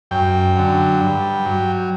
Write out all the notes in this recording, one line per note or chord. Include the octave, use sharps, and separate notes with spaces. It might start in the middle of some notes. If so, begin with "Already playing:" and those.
F#2 G5
D3 F#3
G2
F#3